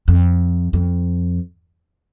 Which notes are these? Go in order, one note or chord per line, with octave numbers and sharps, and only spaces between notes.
F2
F2